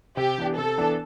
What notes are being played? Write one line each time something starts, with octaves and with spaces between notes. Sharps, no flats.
C3 G4
E3 B3 D4
C3 A4
E3 B3 D4